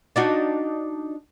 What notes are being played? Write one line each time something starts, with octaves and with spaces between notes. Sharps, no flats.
D4 D#4 F#4